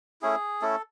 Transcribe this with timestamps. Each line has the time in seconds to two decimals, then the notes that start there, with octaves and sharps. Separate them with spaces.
0.22 A3 C#4 E4 G#4
0.61 A3 C#4 E4 A4